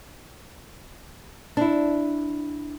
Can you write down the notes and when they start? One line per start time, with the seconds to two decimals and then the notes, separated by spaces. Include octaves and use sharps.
1.57 D4 E4